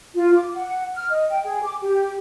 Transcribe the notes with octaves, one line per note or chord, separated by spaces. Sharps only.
F4
D6
F#5
F6
D#5
G5
G#4
D6
G4